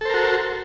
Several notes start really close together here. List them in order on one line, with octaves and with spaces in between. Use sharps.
A4 C5 A#4 F#4